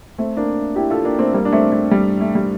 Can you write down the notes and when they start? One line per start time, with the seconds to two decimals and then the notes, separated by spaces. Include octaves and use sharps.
0.18 A3 C4
0.37 A#3 D4
0.76 E4 G4
0.90 F4 A4
1.05 A#3 D4
1.19 A3 C4
1.33 G3 A#3
1.45 D4
1.52 A3 C4
1.72 A3
1.91 G3
2.21 A3
2.35 G3